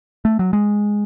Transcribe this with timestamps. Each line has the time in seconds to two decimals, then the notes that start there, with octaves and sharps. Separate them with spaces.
0.25 A3
0.39 F#3
0.53 G#3